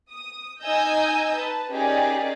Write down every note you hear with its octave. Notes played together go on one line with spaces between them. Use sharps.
D#6
D#4 D#5 G#5 D#6 E6 G6
B4 A5
C#4 D#4 G4 G#4 A#4 D5